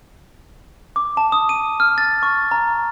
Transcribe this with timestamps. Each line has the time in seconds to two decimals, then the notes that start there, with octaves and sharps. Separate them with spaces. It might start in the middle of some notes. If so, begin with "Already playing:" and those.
0.96 D6
1.17 A5
1.32 D#6
1.49 D#7
1.80 F6
1.98 A6
2.23 C#6
2.51 A#5